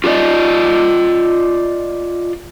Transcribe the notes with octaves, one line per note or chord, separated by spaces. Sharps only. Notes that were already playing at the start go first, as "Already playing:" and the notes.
F4 F#4 A4 D5 D#5